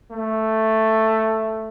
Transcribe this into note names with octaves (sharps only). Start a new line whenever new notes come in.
A3